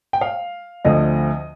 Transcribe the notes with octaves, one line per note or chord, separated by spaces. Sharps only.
G5
F5
D2 D3 F3 C4 D#5